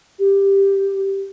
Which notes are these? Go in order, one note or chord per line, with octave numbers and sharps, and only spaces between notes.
G4